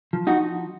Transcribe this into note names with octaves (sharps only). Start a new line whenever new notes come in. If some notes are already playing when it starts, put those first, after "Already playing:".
F3
D#4 F#4